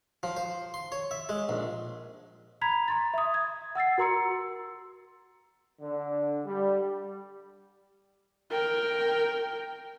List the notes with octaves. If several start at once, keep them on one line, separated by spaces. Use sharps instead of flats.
F3
C5
C6
C#5
E5
G#3
A#1
A#5 B5 G#6 B6 F7
A#5 C6 A6
E5 D#6
G#6
F#5 E6 A6 C7
F#4 A#4 A#5 C6 E6 C#7
D3
G3
A#4 G5